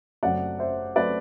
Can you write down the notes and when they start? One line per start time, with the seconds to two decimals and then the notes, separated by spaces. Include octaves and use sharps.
0.23 F#1 F#2 F#3 A3 C4 D5 F#5
0.58 C5 E5
0.96 F#3 A3 C4 B4 D5